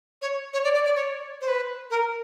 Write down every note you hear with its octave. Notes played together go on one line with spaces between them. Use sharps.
C#5
C#5
D5
D5
D5
C#5
C5
B4
A#4